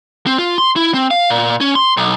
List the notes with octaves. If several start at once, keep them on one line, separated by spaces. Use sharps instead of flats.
C4
F4
C6
E4
C4
F5
A#2
C#4
C6
B1